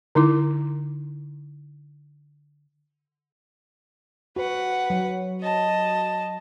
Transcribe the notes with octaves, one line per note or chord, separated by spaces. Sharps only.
D3 D#4 E4 A#4 D6
F#4 B4 F#5
F#3
D#5 A5